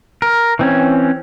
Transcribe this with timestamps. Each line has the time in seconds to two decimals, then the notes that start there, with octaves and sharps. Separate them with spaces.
0.22 A#4
0.59 E3 C4 C#4